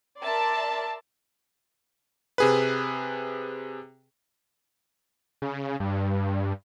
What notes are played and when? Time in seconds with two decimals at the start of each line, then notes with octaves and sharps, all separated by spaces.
0.21 A#4 D5 E5 A5 C6
2.38 C3 G#4 B4
5.42 C#3
5.80 G2